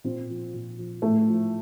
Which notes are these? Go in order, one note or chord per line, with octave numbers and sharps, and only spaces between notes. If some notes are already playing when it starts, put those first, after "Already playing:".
A#2 C4
F3
A#2
F3
A2 A3
F3